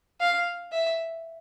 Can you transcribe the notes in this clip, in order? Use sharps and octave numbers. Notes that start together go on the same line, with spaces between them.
F5
E5